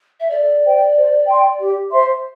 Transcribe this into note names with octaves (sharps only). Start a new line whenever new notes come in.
E5
A4 D5
C5 G5
C5
G5 C6
G4
C5 E5 C6